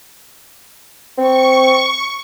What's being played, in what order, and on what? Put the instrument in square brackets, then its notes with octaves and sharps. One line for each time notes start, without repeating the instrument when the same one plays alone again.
[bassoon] C4 [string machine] C#6